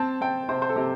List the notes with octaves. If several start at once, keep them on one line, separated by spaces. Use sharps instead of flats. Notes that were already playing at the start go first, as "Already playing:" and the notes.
Already playing: C4 A5
C4 G5
C3 C5
C5
A4
C3 G4